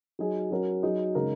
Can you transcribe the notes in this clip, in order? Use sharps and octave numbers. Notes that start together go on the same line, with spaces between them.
F#3 D#4 G#4
F#3 C#4 F#4 A#4
F#3 D#4 G#4
C#3 G#3 D#4 A#4